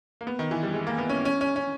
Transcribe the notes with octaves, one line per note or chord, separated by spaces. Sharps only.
A#3
B3
D#3
E3
G3
G#3
A#3
B3
C#4
C#4
C#4
C#4